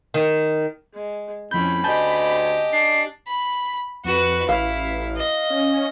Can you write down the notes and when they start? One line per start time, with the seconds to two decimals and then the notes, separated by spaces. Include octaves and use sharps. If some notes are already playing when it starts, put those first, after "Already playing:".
0.14 D#3
0.94 G#3
1.51 F2 A2 C4 C#4 B5 G6
1.84 D2 G4 D#5 G#5 A5 G6
2.73 D4 C7
3.27 B5
4.05 F2 F#4 B4
4.49 A1 E4 F5
5.17 D#5
5.50 C#4